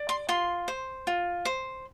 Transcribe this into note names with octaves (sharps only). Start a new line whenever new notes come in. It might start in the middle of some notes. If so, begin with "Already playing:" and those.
Already playing: D5
C6
F4 C6
C5
F4
C5